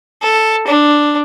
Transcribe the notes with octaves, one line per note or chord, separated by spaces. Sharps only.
A4
D4